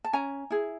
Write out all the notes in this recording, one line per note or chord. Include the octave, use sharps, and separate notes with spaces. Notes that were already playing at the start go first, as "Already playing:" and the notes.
A5
C#4 G#5 A#5
E4 G#4